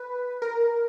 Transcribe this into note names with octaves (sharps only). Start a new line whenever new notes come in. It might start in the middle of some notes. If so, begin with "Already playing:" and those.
Already playing: B4
A#4